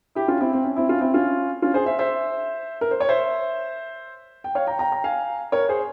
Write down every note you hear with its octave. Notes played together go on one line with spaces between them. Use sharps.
E4 G4
C#4 F4
C4 E4
C4
C#4
C4 E4
C#4 F4
C4 E4
C#4 F4
C#4 F4
G#4 C5
C5 E5
C5 E5
A#4
C5
C#5
C5 E5
G5
C#5 F5
G5 A#5
G5 A#5
G5 A#5
F5 G#5
A#4 C#5
G#4 C5